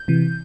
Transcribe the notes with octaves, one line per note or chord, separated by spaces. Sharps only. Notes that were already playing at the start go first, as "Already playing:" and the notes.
Already playing: G6
C3 E3